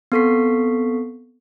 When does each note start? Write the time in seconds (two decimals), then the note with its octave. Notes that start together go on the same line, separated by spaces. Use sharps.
0.12 B3 C4 A4 C#6 B6 C7